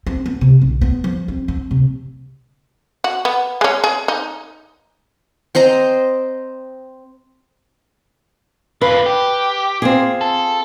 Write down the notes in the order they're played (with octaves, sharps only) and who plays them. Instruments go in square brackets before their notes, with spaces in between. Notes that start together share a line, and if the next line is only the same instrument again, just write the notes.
[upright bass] C4
B3
C3
B1
B3
F3
C4
C4
C3
[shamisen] F#4
B3
G#3 C#4
G#4
D#4
[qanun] C4 C5 D#5 A#5
[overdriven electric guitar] D3 F4 [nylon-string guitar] B4
[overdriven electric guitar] G4
[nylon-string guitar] C4 F4 G#4
[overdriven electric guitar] A4